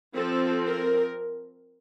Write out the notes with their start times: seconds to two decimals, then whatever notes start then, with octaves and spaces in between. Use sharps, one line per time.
0.15 F3 C4 A4
0.66 A#4